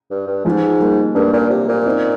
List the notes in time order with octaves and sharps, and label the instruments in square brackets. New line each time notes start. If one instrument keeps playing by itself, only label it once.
[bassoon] G2
G2
[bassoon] G#2 [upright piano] F3 G#3
[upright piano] G3 A#3
[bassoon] G2 [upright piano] A#3 D4
[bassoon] A#2
C3
A#2
[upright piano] C4 D#4